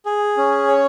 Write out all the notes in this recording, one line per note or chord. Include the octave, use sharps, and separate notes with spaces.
G#4
C#4
C#5